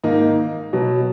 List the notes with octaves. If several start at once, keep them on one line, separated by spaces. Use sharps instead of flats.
G#2 D#3 A#3 D#4
B2 F#3 B3